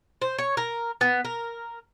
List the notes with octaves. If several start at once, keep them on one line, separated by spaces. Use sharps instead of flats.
C5
C#5
A#4
B3
A#4